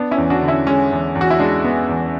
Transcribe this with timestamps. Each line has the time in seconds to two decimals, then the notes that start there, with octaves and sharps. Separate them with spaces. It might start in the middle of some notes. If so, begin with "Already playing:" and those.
Already playing: B3 D4
0.11 C#4 E4
0.18 E2
0.30 D4 F#4
0.42 D3
0.48 C#4 E4
0.67 G#3 C#4
0.92 E2
1.15 E2
1.21 F#4
1.30 E4
1.39 G#3 D4
1.64 B3
1.89 E2